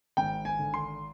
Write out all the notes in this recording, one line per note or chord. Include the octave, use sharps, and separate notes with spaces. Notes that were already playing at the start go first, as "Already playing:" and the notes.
G#1 G5
G#5
D3
C6